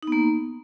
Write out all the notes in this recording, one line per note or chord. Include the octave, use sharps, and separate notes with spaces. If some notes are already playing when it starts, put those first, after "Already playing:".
A#3 B3 D#4